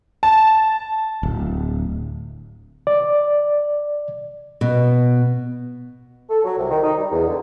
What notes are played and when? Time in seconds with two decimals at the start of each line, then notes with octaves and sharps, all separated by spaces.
0.23 A5
1.23 D1
2.87 D5
4.61 B2
6.30 A4
6.44 F#3
6.58 C2
6.71 D#3
6.83 D#4
6.97 G3
7.11 E2
7.28 D3